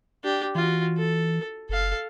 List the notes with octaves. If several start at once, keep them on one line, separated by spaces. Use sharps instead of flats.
D4 G4
E3 F4 F#4
A4
F#1 A4 F5